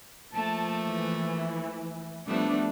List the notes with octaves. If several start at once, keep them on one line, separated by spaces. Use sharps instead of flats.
F3 A3 A#3 A5
E3
F3 G3 A3 B3 D4